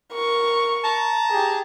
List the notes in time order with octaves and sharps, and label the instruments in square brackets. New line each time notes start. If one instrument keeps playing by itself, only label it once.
[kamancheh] A#4 C#6
[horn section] A5 A#5
[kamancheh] G4 G#4